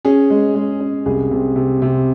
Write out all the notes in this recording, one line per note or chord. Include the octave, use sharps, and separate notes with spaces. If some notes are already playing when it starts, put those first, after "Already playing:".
C#4 G#4
G#3
G#3
C#4
C2 G#4
C3
C3
C3